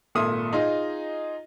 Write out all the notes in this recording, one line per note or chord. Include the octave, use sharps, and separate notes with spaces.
G#1 A#2 A4 E5 D#6
D#4 F4 G#4 D#5